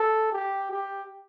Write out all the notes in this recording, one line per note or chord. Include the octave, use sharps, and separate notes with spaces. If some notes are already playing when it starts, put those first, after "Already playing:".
Already playing: A4
G4
G4